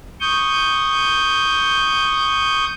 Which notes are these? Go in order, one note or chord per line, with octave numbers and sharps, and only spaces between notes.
C#6 D#6 G6